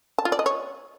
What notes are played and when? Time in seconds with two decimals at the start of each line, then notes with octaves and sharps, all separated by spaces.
0.18 A5
0.25 F4
0.32 D5
0.39 D#5
0.46 C#5